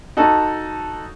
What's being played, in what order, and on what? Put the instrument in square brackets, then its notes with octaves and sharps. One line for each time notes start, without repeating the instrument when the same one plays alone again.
[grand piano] D#4 F#4 A4